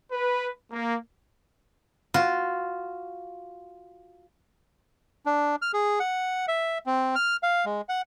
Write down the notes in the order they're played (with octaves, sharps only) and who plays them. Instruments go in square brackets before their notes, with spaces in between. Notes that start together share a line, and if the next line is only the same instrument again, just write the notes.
[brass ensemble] B4
A#3
[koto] F4 F#4
[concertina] D4
F6
G#4
F#5
E5
C4
F6
F5
G#3
F#5